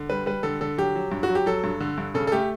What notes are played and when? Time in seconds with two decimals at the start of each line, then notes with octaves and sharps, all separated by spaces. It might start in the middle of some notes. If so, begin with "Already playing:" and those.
Already playing: D3
0.10 G3 B4
0.26 G3 B4
0.43 D3 A4
0.61 D3 A4
0.78 F#3 G4
0.95 F#3
1.12 G2
1.23 F#4
1.29 F#3
1.35 G4
1.46 F#3 A4
1.64 G2
1.80 D3
1.98 G2
2.14 C#3 A4
2.27 A4
2.32 A3 G4